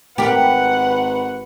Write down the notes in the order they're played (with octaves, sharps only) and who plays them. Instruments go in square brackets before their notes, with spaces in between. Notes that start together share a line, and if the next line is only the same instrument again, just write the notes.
[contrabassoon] G#1 [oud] G4 A#4 [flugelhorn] B4 [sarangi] F#5